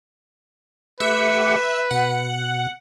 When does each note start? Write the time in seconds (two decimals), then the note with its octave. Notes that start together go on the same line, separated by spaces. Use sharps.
1.00 A3 G4 B4 E5 F#5
1.91 B2 F#5